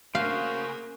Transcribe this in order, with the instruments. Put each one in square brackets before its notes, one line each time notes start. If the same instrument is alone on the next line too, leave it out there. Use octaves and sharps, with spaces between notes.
[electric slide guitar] C#3 [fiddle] A#3 [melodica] F#4 C5 [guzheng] F5